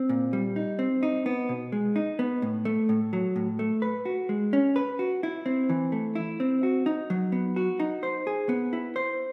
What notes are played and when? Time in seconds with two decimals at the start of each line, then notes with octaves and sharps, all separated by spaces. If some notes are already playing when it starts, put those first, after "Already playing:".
Already playing: C4
0.09 A#2
0.33 G3
0.56 D#4
0.79 C4
1.03 D#4
1.26 B3
1.49 B2
1.72 G#3
1.96 D#4
2.19 B3
2.42 A2
2.65 A3
2.89 A2
3.13 F#3
3.36 A2
3.59 A3
3.82 B4
4.05 F#4
4.29 G#3
4.53 C#4
4.76 B4
4.99 F#4
5.23 E4
5.46 C4
5.70 E3
5.92 A3
6.15 E4
6.40 C4
6.63 F#4
6.86 D#4
7.10 F#3
7.32 B3
7.56 F#4
7.80 D#4
8.03 C5
8.27 G#4
8.49 B3
8.73 E4
8.96 C5